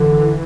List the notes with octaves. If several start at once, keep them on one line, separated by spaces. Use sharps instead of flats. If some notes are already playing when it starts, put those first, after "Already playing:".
Already playing: D3 E3